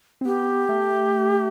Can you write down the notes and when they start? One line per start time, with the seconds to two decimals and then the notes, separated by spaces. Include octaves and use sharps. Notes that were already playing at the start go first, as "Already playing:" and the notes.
0.21 C4
0.25 B3 G4
0.69 A3